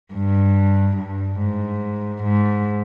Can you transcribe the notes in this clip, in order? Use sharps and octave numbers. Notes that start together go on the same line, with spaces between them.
G2
G2
G#2
G#2